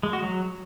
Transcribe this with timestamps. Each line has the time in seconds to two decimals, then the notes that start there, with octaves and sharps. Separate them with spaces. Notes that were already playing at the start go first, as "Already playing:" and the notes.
0.03 G#3
0.13 F#4
0.23 F#3